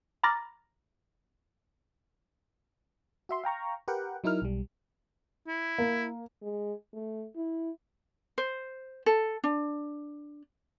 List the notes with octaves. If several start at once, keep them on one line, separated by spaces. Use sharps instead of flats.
A#5 B5 D6 F6 A6 A#6
F#4 E5 C6
F5 G5 A#5 C#6
G4 A#4 B4 F#5 G5
F#3 D#4 E4 A#4 F6
B1 G3
E4
A#3
G#3
A3
E4
C5
A4
D4